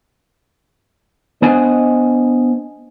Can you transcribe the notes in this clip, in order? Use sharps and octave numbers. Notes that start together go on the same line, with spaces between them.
B3 D4 C5 D#5 F#5 G#5